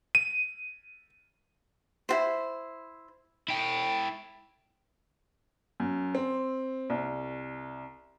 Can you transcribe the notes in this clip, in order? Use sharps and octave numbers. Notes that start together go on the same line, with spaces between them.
D#7
E4 F#4 C5
E4 G5
F#2
C4
C2